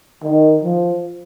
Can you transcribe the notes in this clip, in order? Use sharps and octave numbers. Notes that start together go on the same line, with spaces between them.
D#3
F3